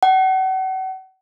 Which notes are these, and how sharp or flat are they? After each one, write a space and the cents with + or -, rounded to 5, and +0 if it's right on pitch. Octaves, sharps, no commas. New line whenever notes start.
F#5 +40